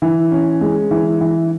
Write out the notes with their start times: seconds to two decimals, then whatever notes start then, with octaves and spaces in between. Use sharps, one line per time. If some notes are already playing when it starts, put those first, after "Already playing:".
0.02 E3
0.32 C#4
0.61 G#3
0.91 E3
1.21 E3